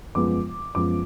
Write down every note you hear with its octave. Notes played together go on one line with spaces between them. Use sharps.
F#2 F3 G#3 B3 D6
F#2 F3 G#3 B3 D6